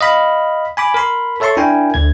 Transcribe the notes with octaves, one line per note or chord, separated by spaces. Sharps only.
D#5 F5 B5
G#5 B5 D6
A#4 B5 C6
A4 C#5 E5 A5 C6 C#6
D4 E4 A#4 G5 G#5
D2 D3 G#6